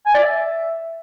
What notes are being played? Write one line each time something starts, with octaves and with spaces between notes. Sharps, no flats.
G#5
D5
E5